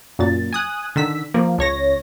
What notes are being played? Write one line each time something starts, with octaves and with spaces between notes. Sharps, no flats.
F#2 A#2 A6
G#5 D#6 F#6
D3 D#3 E6 B6
F3 A#3
C#2 C#5 A#6